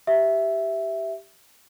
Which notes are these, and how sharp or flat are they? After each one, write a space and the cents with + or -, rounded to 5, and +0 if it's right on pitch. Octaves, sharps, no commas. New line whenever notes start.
G4 -5 E5 +0